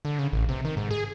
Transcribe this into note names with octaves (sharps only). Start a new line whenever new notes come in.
D3
C#3
A1
C3
D#3
G#2
G#4